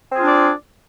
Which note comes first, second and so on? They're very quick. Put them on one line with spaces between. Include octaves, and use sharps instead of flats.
C4 G#4 F4 D4 D5